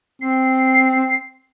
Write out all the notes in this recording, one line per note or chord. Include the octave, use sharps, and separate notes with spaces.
C4 C7